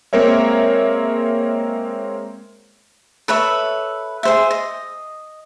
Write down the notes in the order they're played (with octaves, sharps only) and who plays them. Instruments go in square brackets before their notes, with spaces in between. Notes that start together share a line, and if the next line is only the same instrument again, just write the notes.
[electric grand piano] G#3 A#3 C4 A#4 C#5 E5
[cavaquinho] A4 B4 C#5 E5
G#4 C5 E5
D#5